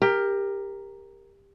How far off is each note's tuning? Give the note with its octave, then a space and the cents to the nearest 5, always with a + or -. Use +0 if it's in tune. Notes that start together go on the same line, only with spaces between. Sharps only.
G4 +20 A#4 +0